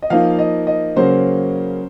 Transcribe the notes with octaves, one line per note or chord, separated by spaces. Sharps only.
D#5
F3 A#3 D#4 F5
D#5
D#5
C#3 F#3 A#3 C#4 C5